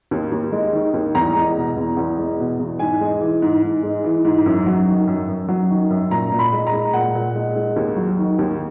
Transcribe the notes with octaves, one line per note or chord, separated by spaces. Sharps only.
D#2
D#2
G#3
D#3
D#2
E2 A#5
G#3
B2
E2
E2
G#3
B2
E2
G#2 G#5
G#3
E3
G#2
G#2
G#3
E3
G#2
F#2
F#3
D#3
F#2
F#2
F#3
D#3
F#2
A#2 A#5
A#2
B5
G#3
A#5
G#3
A#2 F#5
A#2
G#3
G#3
D#2
F#3
D#3
D#2